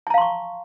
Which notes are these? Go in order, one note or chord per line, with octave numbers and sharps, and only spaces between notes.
F5 A5 A#5 C6 C#6